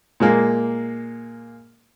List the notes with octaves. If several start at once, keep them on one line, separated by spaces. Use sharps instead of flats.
A#2 G#3 A#3